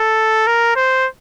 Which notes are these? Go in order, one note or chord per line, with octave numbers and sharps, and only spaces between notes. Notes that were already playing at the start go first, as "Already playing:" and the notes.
Already playing: A4
A#4
C5